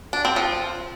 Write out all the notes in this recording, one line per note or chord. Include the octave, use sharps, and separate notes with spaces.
D4
C4
F3